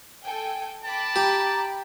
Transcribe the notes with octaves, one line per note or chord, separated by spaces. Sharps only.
A4 G5 G#5
G5 A5 B5 D6
G4 A#5